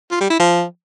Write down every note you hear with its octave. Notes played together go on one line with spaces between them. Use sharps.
F4
G3
E4
F3